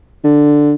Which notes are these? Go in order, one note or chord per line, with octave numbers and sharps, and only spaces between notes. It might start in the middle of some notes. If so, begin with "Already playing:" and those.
D3